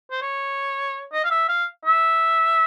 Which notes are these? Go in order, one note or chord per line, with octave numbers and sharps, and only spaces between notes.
C5
C#5
D#5
F5
E5
F5
E5